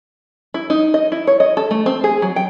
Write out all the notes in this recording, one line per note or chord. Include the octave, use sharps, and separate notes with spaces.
E4
D#4
D#5
E4
C#5
D#5
A4
A3
C4
G#4
F#3
G5